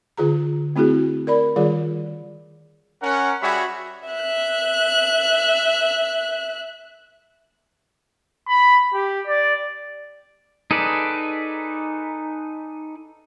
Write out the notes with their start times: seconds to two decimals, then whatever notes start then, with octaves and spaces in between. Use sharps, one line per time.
0.17 D3 F4 G#4 A#5
0.76 A3 C4 E4 F#4 G#4
1.27 A#4 D5 B5
1.56 D#3 G3 F4 G#4 D5
3.02 C#4 A#4 F#5
3.42 G3 F#4 G#4 C#5 E5 B5
4.09 E5 F#6
8.48 B5
8.94 G4
9.27 D5
10.71 D#4 G#4 A4 B4 D5